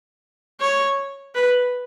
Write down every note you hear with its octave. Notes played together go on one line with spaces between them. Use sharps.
C#5
B4